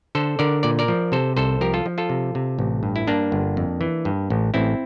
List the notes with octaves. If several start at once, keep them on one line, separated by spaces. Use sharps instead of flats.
D3 A4 C5
D3 A#4 D5
A#2 D5
A#4 D5
F3
C3 A4 C5
C2 A4 C5
F3 G4 A#4
F4 A4
F3
F4 A4
C3
C3
A1
G2
E4
G2 A#3 D4
G1
F2
E3
G2
A1
A1 C4 E4